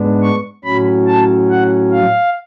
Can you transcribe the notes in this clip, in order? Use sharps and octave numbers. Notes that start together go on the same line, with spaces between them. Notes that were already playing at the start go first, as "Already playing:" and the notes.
Already playing: G#2 G#3 B3 D4
C#6
A2 F#3 C#4 B5
A5
F#5
F5